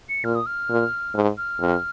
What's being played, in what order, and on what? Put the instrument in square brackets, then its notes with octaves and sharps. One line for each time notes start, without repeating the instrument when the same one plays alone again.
[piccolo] C#7
[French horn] A#2 [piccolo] F6
[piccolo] D#6
F6
[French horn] A#2
G#2
[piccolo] F6
[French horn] F2